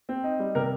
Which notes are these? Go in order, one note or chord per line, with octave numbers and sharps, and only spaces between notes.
C4
D#4
G3
C3 A#4